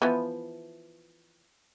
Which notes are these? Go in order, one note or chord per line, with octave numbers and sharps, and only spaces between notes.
E3 F3 B3